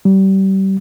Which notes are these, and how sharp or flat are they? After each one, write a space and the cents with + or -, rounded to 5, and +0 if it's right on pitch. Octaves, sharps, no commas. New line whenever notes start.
G3 -30